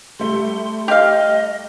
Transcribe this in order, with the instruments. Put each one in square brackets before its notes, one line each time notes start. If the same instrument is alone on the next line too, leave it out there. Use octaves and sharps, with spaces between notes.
[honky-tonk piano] G3 A3 [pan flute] C6
[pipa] G4 F5 [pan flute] D#5